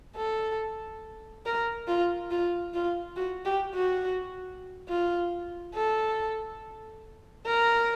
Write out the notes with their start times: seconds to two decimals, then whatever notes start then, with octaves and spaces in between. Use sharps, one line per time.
0.16 A4
1.46 A#4
1.88 F4
2.31 F4
2.74 F4
3.16 F#4
3.45 G4
3.74 F#4
4.89 F4
5.74 A4
7.46 A#4